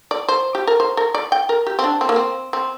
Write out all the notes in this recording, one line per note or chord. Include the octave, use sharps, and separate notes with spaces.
D5
C5
G4
A#4
C5
A#4
D5
G5
A#4
G4
C4
D4
C4
A#3
C4
C4